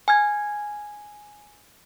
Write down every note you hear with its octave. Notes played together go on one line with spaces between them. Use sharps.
G#5 F6 G#6